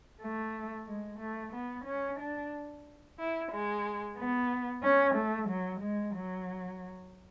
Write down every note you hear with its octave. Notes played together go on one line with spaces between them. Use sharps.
A3
G#3
A3
B3
C#4
D4
E4
G#3
B3
C#4
A3
F#3
G#3
F#3